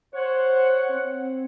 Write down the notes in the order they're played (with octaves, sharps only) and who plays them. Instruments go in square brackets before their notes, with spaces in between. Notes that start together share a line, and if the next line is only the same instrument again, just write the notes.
[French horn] C5 [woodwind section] C#5 F#5
[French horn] C4